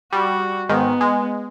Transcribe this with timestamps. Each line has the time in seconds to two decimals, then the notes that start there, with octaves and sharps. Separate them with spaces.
0.13 G3 F#4
0.69 G#2 D#3 G#3 B3
1.01 G#3